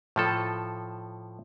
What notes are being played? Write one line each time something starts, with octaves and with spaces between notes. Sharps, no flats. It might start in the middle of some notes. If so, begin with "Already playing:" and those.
A2 F3 A4